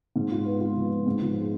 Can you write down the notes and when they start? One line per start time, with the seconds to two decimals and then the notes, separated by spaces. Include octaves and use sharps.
0.16 G#2
0.31 F4
0.46 B3
0.60 F4
0.76 F3
0.91 B3
1.07 G#2
1.21 F3
1.37 G#3